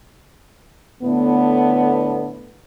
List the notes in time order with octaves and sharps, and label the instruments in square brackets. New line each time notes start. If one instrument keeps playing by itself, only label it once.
[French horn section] A2 D3 B3